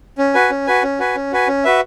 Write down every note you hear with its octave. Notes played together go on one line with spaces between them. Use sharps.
C#4
F#4 B4 G#5
C#4
F#4 B4 G#5
C#4
F#4 B4 G#5
C#4
F#4 B4 G#5
C#4
F#4 B4 E5